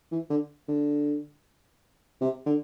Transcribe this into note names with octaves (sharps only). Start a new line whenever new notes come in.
E3
D3
D3
C3
D3